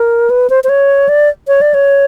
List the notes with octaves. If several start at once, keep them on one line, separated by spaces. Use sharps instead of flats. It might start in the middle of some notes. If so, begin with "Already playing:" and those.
Already playing: A#4
B4
C5
C5
C#5
D5
C#5
D5
C#5